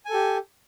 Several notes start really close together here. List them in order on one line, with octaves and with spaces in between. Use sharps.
G#5 A4 G4